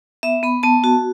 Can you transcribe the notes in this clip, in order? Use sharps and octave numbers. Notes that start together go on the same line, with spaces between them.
B3 E5
B3 B5
B3 A5
F#4